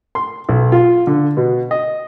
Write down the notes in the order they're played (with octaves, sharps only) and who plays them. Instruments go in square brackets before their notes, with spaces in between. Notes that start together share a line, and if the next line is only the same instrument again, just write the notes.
[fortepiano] C6
B1
F4
D3
B2
D#5